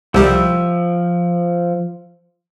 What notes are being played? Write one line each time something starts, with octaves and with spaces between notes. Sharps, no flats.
C2 F3 G3 E5 G5